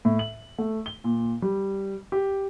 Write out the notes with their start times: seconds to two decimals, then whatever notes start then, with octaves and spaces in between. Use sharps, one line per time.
0.05 A2
0.19 F#7
0.58 A3
0.86 G7
1.04 A#2
1.42 G3
2.12 G4